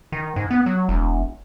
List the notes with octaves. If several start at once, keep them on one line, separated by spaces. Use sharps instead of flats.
D#3
G#2
B3
F#3
E1